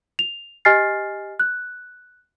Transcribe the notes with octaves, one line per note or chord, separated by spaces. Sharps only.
F7
G4 D#5 G#5 F6 A6 C7
F#6